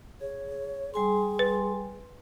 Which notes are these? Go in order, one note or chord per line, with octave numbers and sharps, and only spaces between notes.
G#4 C#5
G3 G#4 G#5 C6
B4